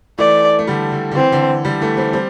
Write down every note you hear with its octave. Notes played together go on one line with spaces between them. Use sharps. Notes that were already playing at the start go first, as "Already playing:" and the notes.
E3 A3 D5
A3
D3 G3
D3
D3
E3 C4
D3
D3 G3
E3 A3
G3 C4
G3 C4